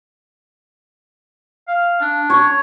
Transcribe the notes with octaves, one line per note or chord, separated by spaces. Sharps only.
F5
D4
C#5